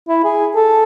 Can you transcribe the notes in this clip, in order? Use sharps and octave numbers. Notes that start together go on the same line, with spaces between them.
E4
G#4
A4